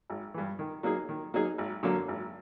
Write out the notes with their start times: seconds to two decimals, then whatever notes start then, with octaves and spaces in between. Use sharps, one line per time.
0.10 G#1
0.34 G2 E3
0.59 D#3
0.83 F#3 A#3 D#4 G#4
1.09 D#3
1.34 F#3 A#3 D#4 G#4
1.58 G#1
1.83 F#2 D3 F#3 A#3
2.08 G#1